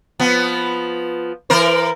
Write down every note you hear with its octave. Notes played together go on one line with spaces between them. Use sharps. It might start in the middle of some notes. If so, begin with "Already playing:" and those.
F3 B3
E3 A#4 C5